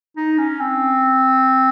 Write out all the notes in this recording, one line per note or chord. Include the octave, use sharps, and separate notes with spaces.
D#4
C#4
C4